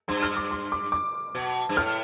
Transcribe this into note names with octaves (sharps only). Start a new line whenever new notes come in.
G2 C6
F6
D6
C6
D6
D6
B2
G2
A2 F6